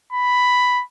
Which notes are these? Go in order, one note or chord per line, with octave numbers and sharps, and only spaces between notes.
B5